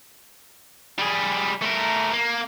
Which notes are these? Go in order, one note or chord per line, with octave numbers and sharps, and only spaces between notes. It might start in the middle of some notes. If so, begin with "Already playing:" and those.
G3 G#4
A3 A#4
A#3